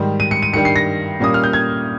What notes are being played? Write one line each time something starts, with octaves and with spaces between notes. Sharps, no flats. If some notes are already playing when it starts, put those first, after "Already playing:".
Already playing: G#2 D#3 G3
D#7
C#7
D#7
G2 D#3 G3 C#7
C7
A#6
A#2 G3 A#3 C#4 D#6
F6
G6
G#6